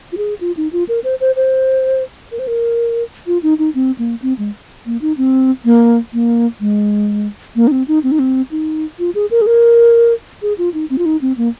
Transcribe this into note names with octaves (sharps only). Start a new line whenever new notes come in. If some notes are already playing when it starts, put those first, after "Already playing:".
F4
G#4
F4
D#4
F4
A#4
C5
C5
C5
A#4
C5
A#4
F4
D#4
D#4
C4
A#3
C4
G#3
A#3
D#4
C4
A#3
A#3
G#3
A#3
D#4
C4
D#4
C4
D#4
C4
D#4
F4
G#4
A#4
G#4
A#4
G#4
F4
D#4
C4
F4
D#4
C4
A#3